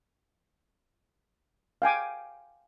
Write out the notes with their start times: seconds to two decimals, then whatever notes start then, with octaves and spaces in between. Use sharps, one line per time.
1.82 F5 G5 G#5 D6